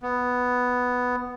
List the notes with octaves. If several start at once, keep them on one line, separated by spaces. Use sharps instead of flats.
B3